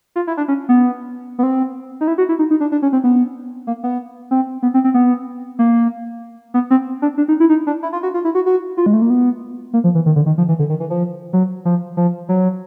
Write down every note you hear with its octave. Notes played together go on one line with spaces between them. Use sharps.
F4
E4
D4
C#4
B3
B3
C4
D#4
E4
F#4
E4
D#4
D#4
D4
D4
C#4
C4
B3
A#3
B3
C4
B3
C4
C4
B3
A#3
B3
C4
D4
D4
D#4
E4
D#4
D4
E4
F4
F#4
F4
E4
F#4
F#4
F4
G#3
A3
A#3
B3
A#3
F3
E3
D#3
D3
D#3
F3
E3
D3
D#3
E3
F3
F#3
F3
F3
F#3